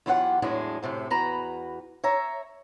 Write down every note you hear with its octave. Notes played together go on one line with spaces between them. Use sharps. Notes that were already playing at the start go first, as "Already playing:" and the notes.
E2 F#3 E4 F4 G4 F#5
E2 A2 F#3 G#3 D4 G#4
F#2 A2 C3 A3
E2 F#4 B4 A#5
C#5 E5 A#5